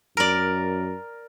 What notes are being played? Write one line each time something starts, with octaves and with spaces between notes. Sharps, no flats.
F#2 A#4 D5